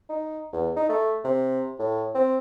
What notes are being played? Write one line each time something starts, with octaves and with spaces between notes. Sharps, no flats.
D#4
E2
D#4
A3
C3
A2
C4